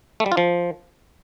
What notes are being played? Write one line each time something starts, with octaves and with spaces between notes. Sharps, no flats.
A3
G3
F4
F3